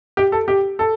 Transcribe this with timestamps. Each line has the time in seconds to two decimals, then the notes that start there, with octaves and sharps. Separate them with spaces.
0.17 G4
0.32 A4
0.48 G4
0.79 A4